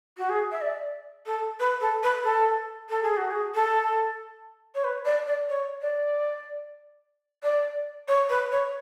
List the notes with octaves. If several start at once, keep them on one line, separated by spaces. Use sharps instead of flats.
F#4
G#4
E5
D5
A4
B4
A4
B4
A4
A4
G#4
F#4
G#4
A4
C#5
B4
D5
D5
C#5
D5
D5
C#5
B4
C#5